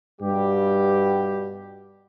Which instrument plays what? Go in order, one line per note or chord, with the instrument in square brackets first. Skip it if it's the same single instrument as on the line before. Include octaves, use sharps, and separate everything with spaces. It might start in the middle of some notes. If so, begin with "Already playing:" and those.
[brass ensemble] G2 B2 G3 G4